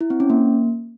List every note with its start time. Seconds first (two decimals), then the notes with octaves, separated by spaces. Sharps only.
0.01 E4
0.10 C4
0.20 C#4
0.30 A#3